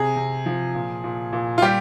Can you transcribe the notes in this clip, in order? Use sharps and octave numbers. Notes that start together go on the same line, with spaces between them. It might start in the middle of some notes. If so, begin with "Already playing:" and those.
Already playing: C3 G#4
C3
F3
A#2
A#2
A#2
F4
G3 G4